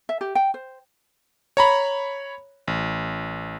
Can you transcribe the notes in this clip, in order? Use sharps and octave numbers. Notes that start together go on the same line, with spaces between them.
E5
G4
G5
C5
C#5 A#5 B5
A1